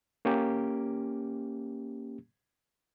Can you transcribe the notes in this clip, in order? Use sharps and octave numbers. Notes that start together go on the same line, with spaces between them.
A#3 C#4 G4